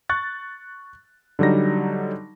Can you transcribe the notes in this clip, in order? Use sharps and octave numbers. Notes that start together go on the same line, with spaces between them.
C#6 F#6 A6
D3 F#3 G3 D#4 A#6